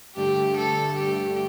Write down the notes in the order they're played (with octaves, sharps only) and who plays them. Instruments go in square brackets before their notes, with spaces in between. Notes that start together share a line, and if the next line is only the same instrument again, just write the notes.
[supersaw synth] G2 D3 A3 [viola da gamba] G4
[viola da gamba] A4
G4